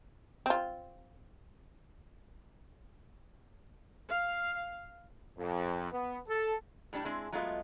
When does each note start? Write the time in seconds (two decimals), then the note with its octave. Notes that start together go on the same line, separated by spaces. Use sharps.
0.46 C4 F4
4.10 F5
5.38 F2
5.92 B3
6.28 A4
6.93 A2 G3 D4 A5
7.05 G#3 C4 D4 E4 G#4
7.32 F#3 G#3 A3 B3 F4 D#5